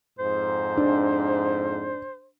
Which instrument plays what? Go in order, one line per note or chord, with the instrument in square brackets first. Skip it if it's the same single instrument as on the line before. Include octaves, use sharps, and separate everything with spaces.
[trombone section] F2 G#2 [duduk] C5
[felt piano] D4